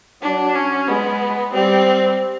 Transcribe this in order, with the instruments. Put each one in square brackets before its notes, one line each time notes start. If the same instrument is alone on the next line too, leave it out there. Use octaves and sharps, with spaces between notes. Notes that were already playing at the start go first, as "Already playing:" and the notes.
[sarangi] F#3 [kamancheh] D4
[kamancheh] C#4
[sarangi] G#3 [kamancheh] B3
[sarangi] G3 [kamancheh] C4